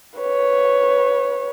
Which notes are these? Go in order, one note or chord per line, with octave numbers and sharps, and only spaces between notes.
B4 C#5